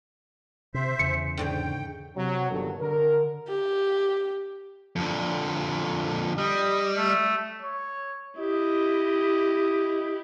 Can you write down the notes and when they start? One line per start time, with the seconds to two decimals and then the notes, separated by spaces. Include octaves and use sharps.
0.74 C3 C5 E5
0.99 E2 C#3 C#7
1.37 G#2 D3 C#5 G5
2.15 C3 F#3
2.49 G1 G2 A#2 D#3 F#3 A4
2.80 D3 A#4
3.48 G4
4.96 F2 D3
6.38 G3 D#5
6.97 A3
7.62 C#5
8.38 E4 G4 D#5